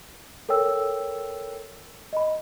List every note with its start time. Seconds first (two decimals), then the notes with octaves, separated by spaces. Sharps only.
0.49 A4 A#4 C#5 G5 E6
2.13 D#5 B5